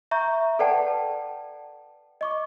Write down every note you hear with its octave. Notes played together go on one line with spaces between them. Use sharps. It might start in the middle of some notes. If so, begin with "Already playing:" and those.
E5 A#5 C#6 G6
A4 B4 D5 F#5 G5 A5
D#5 C#6 D6